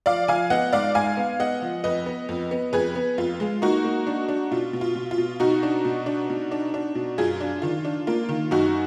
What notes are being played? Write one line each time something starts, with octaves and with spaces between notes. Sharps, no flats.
F3 D5 F5
F3 F5 G#5
B3 D#5 F#5
G#2 D5 F5
G#2 F5 G#5
B3
B3 D#5 F#5
F3
F2 B4 D#5
B3
F2
B3
F2 G#4 B4
B3
F2 F4
G#3
A#3 D#4 F#4
A#3
D4
D4
B2 F4
B2
F4
B2
F4
B2
B2 D#4 F#4
D4
B2
D4
B2
D4
D4
B2
F#2 F4 G#4
D4
D#3 F4
D4
A#3 F4
D#3
F#2 D#4 F#4